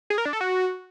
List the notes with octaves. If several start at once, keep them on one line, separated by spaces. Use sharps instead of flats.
G#4
A#4
D4
A4
F#4